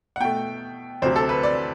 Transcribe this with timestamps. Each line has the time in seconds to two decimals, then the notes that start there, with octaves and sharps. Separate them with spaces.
0.16 F#5
0.20 B2 A3 G5
1.02 D2 C3 F#3 C5
1.16 A4
1.29 B4
1.43 D5